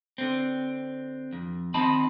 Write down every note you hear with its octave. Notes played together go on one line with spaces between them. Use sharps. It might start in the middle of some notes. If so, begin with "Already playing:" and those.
D3 C4
F2
D#3 C4 D#5 A5 B5